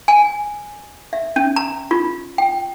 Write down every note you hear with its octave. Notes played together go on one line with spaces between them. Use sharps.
G#5
E5
C#4
A#5
F4
G5